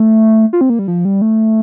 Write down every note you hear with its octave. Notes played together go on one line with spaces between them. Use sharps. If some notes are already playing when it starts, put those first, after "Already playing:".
Already playing: A3
F4
C4
A#3
G3
F3
G3
A3